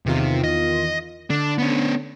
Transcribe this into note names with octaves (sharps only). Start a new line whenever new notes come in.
E2 C3 D#3 F4
D#5
D3 D4
B3 C#4